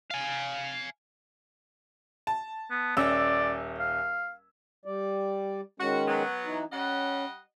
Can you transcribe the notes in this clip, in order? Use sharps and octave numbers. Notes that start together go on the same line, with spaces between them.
F5 G#5
A5
B3
D#1 C#4 D5 E6
F5
G3 D5
D#3 G#3 C#4 F#4
F#3 B3
E3 D#4
G3 C#4 D#5 F#5